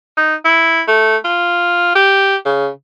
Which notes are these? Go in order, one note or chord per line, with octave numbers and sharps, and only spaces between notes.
D#4
E4
A3
F4
G4
C#3